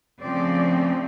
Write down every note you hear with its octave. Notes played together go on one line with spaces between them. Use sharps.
C#3 F3 A3 C4 D5